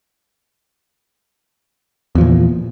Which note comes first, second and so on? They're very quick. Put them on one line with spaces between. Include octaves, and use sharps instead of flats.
E2 F3 A#2